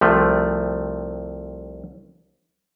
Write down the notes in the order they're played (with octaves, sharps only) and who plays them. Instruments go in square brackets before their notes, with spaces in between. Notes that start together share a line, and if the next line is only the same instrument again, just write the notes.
[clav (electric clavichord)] C2 C3 F3 A3